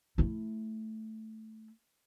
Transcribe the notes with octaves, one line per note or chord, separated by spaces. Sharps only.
A3 E4